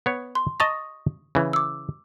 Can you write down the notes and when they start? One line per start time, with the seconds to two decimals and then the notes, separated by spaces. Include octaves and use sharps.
0.06 B3 C#5
0.35 C6
0.60 D#5 A5 A#5 C#6 D#6 A#6
1.35 C#3 E3
1.53 D6 E6